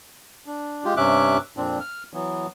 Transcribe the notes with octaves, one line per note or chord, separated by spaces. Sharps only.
D4
G#3 F4 G4
G2 C3 C#4 E5 D6 F#6
F2 A#2 C4 D4
F6
E3 F#3 B3